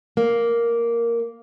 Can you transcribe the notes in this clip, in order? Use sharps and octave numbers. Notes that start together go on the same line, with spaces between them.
A#3